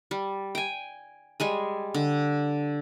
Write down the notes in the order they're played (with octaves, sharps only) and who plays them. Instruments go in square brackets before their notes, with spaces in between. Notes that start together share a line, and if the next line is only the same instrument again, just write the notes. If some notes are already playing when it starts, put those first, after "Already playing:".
[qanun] G3
G5 G#5
G3 G#3 G#5
D3